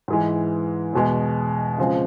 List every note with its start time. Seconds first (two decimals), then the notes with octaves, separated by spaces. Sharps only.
0.08 G#2 E3 G#3
0.93 E2 B2 G#3
1.78 C#3 F3 G#3 C4